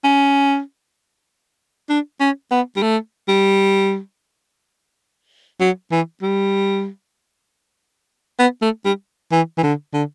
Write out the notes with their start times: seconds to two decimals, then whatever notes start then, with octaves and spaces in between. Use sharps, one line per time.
0.04 C#4
1.89 D4
2.20 C#4
2.51 B3
2.76 G3
2.82 A3
3.28 G3
5.60 F#3
5.91 E3
6.22 G3
8.39 B3
8.62 A3
8.85 G3
9.32 E3
9.58 E3
9.63 D3
9.94 D3